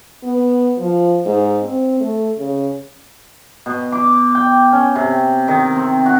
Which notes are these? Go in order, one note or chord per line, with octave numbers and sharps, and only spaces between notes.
B3
F3
G#2
C4
A3
C#3
B2
D6
G5
C#4
C3
D#3
C4
F#4